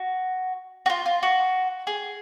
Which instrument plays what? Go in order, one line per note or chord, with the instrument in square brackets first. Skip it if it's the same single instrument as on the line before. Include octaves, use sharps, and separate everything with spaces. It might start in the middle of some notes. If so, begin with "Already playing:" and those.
Already playing: [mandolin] F#4
F#4
F4
F4
F#4
G#4